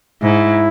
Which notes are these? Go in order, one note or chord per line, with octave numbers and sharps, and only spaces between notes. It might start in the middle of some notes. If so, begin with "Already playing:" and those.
G#2 E4